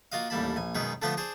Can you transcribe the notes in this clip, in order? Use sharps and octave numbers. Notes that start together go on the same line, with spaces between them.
A#3 F4 F#4 D#5 F5
A1 D#2 G3 A#3 A5 B5
A#1 G#5
F#2 B2 D#3 G#3 B4
D3 F3 A3 B3 B4 C6
D4 G#4 C5